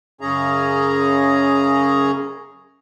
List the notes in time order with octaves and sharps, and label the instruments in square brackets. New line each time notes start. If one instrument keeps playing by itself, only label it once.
[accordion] F#2 C#3 C#4 G#4 A#5